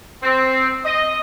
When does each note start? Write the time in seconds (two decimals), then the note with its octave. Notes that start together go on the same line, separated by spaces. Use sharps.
0.23 C4
0.85 D#5